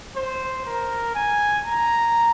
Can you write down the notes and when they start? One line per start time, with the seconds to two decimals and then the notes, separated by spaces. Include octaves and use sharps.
0.16 C5
0.65 A#4
1.15 G#5
1.65 A#5